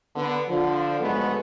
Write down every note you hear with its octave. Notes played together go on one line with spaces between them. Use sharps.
D3 B3
D3 F3
G#2 D3 F#3 G#3 A3 B3